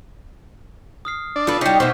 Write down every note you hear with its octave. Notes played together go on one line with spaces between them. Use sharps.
D#6 F6 C7
D4 D5
F4 A4 B4 D6
G3 C#4 D#4 G6 B6 C7
B2 A3 C5 C#6 F6 G6